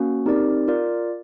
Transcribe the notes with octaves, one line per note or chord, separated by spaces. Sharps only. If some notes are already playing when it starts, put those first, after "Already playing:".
Already playing: A#3 C#4 F#4
C4 D#4 G4 A#4 D5
F4 A#4 D5